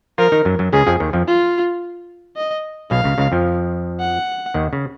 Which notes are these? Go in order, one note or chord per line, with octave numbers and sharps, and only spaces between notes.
F3 F4 A#4
D#3 D#4
F#2 F#3
F#2 F#3
C#2 C#3 G#4
F2 F3
D#2 D#3
F2 F3
F4
D#5
B1 B2 F5
C#2 C#3
C#2 C#3
F2 F3
F#5
D#2 D#3
C#3